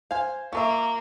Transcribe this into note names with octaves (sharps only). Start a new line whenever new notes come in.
C5 F5 G#5
A#3 F4 A#4 E5 C#6 D6